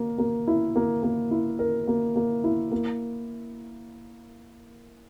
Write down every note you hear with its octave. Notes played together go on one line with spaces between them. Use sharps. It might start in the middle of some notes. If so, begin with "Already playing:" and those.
Already playing: A#3 A#4
A#3
E4
A#3
A#3
E4
A#4
A#3
A#3
E4
A#3